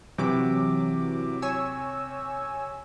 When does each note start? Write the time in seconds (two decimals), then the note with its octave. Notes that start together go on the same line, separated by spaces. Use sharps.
0.18 C3 E3 F#3 D6
1.42 C#5 G#5 E6